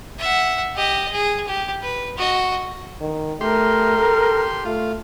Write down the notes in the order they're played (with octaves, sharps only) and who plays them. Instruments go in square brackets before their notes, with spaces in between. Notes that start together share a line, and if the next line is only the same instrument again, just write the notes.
[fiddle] E5 F#5
G4 D#5
G#4
G4
B4
F#4 D#5
[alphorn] D#3
[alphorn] A3 [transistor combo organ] G4 C6 [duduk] A#4
[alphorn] A4
[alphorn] A3 [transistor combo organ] F4